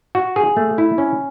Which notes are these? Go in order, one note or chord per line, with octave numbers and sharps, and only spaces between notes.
F#4
G#4
A3
E4
C#4